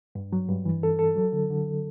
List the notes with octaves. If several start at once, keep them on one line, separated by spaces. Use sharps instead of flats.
G2
F#3
G2
E3
A4
A4
F#3
D3
D3